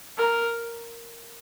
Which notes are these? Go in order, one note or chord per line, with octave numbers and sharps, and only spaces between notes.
A#4